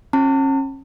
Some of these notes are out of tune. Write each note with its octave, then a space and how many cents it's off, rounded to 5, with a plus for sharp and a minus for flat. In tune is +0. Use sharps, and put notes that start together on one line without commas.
C#4 -35 A5 +40